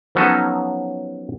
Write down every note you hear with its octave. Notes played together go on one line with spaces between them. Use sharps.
F3 F#3 B3 C#4 D#4 A4